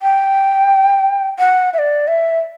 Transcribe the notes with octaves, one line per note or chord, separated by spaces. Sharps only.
G5
F#5
E5
D5
E5